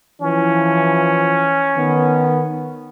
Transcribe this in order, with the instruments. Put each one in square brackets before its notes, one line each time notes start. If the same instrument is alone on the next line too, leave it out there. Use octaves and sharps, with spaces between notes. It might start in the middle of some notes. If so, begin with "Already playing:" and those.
[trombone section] E3 F3 [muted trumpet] C#4
[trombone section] D#3 B3